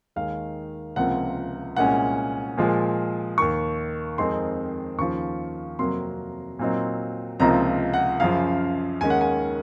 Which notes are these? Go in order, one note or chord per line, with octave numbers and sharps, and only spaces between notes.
D#2 D#3 G#3 F5
C#2 C3 F3 A#3 F#5
C2 A#2 G#3 C#4 F#5
A#2 F3 G#3
D#2 D#3 A#3 C#6
F2 D#3 G#3 C4 D#4 C6
D#2 C#3 F3 C#6
F2 C3 F#3 A#3 C6
A#2 F#3 C4 D#4
C#2 C3 F3 A#3 D#4 A#5
F#5
F#2 C#3 F3 F5
D#2 D#3 G#3 C#4 G#5
F#5
G#5